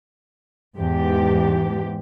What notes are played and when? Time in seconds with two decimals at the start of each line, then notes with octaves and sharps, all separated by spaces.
0.78 E2 G#2 G4